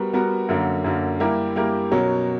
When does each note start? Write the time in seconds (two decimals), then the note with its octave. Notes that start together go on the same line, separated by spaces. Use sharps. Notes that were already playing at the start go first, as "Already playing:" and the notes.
Already playing: G3 B3 F#4 A#4
0.13 G3 B3 F#4 A#4
0.49 F#2 D3 F#3 A#3
0.84 F#2 D3 F#3 A#3
1.20 G3 A#3 E4 G4 A#4
1.56 G3 A#3 E4 G4 A#4
1.91 B2 F#3 C#4 F#4 A#4